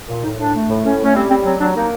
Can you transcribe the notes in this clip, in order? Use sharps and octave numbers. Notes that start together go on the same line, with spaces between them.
A#2
A2 D#4
A2 D4
A3
A2
A2 C#4
A3 C#4
G3 C4
G3 C4
F#3 C4
F#3 D4
A#3 D#4